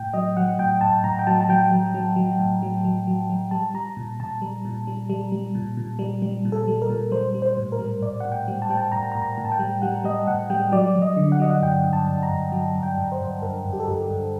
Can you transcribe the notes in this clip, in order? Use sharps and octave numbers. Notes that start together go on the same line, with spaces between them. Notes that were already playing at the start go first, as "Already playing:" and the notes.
Already playing: A2 G5
F#3 D#5
F#3 F#5
A2 G5
A2 A5
A2 A#5
G5
F#3 A5
A5
F#3 G5
F#3
F#3
F#3
A2
F#3
F#3
F#3
F#3
G3 A5
G3 A#5
A#2
A#2 A5
G3
A#2
G3
G3
G3
A#2
A#2
G3
G3
A#2
A4
G3
A#4
A#2
G3 C5
G3
C5
A2
A#4
G3
A2 D5
A2 F#5
G5
G3
A5
G3 G5
A5
A2 A#5
A#5
A2
A#5
A2
A5
G5
G3
G3 F#5
G3 D#5
A2 F#5
G3 G5
F#3 D5
F#3
D#5
D3
F#5
F#3 D#5
F#5
G2 G5
G2
A5
G2
A#5
G2
F#3
G2
G5
G2
C5
G2
G2 A#4
G2
G4
A4
G2 G4
G2